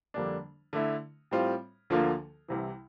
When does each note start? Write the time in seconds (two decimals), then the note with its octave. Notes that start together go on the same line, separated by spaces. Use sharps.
0.14 F2 D3 G3 A#3 D4
0.73 D3 A3 E4
1.31 A2 G3 C4 F4
1.90 D2 D3 F3 A#3 F4
2.48 C2 C3 E3